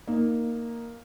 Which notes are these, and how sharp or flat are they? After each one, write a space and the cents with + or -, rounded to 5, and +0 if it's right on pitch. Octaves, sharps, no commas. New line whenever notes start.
A#3 +0 D#4 +0